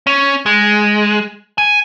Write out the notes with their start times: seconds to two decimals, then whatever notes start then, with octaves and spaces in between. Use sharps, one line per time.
0.07 C#4
0.46 G#3
1.58 G#5